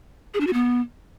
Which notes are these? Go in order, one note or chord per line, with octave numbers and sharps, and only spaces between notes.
G#4
D4
F#4
B3